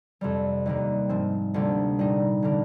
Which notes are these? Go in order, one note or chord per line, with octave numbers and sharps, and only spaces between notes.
F2 C3 G3
D#2 D#3 G3 A#3
G#2 F3 C4
D2 C3 G3 A#3
A#2 G3 C4 D#4
D3 G3 A#3